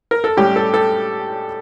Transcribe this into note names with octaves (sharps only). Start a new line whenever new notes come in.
A#4
A4
A2 G3 C#4 G4
A4
A4